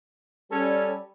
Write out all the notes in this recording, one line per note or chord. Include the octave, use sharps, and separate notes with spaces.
G3 C#4 A4